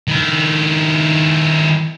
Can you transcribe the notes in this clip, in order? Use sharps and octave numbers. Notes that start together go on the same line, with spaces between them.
D#3 E4